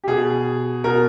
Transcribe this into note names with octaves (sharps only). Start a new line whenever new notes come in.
G4
B2 G#4
B2 A#4